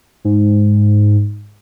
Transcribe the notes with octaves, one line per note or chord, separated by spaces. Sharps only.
G#2